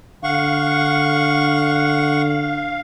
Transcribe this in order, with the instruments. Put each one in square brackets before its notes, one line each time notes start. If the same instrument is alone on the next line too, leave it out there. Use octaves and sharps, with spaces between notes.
[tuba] D3 [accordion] F5 [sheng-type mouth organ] F#5 C#6